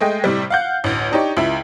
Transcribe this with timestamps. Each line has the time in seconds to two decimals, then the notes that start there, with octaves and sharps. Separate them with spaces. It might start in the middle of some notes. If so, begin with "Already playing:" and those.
0.01 G#3 A3 D#5 G5
0.24 A2 C3 G3
0.50 F5 F#5 G6
0.84 A1 D2
1.11 D4 D#4 G4 C#5
1.37 C#2 E4